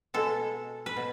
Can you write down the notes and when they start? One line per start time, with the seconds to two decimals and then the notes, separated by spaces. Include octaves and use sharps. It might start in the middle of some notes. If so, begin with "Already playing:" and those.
0.14 B2 G#3 A4
0.86 B4
0.97 B2